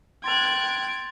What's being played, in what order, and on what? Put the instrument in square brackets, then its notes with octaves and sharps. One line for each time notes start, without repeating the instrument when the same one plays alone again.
[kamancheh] G5 F#6 [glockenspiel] C6 A6 F7 [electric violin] G#6 D7